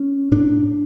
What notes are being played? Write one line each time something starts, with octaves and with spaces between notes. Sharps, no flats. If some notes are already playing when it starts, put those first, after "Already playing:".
Already playing: C#4
A2 D4